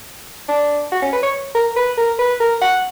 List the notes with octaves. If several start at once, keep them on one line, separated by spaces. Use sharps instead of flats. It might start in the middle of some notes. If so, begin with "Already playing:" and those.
D4
F#4
C#4
B4
C#5
A#4
B4
A#4
B4
A#4
F#5